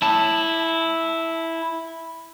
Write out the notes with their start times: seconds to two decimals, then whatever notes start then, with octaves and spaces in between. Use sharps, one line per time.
0.02 E4 A5